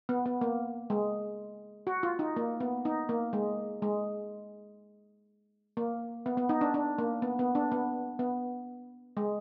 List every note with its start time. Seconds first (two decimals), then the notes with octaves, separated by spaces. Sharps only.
0.09 B3
0.26 B3
0.41 A#3
0.90 G#3
1.87 F#4
2.03 F4
2.19 D#4
2.36 A#3
2.60 B3
2.85 D#4
3.09 A#3
3.33 G#3
3.82 G#3
5.77 A#3
6.26 B3
6.37 B3
6.49 D#4
6.61 D4
6.74 D4
6.98 A#3
7.22 B3
7.39 B3
7.55 D4
7.72 B3
8.19 B3
9.17 G#3